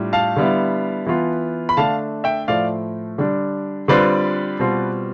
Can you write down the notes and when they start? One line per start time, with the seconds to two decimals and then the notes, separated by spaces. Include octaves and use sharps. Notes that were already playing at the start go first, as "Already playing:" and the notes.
Already playing: A2 G3 D4 F4
0.13 F5 A5
0.36 D3 G3 B3 E4
1.07 E3 B3 F4
1.69 B5
1.77 D3 A3 D4 F5 A5
2.24 E5 G5
2.48 A2 F3 A3 D5 F5
3.18 D3 G3 D4
3.88 D3 G3 C4 F4 B4 D5
4.59 B2 G3 C4 F4